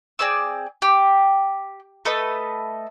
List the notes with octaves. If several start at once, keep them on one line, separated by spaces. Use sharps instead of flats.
C4 G#4 D5 E6
G4
A3 A4 B4 D#5